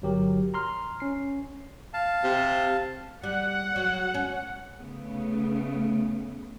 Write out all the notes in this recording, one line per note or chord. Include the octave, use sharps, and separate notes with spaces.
G1 F#3 G4 A#4
A#5 C6 F6
C#4 C7
F5 A5
C3
G3 F#5
F#3
C#4
C#3 A3 B3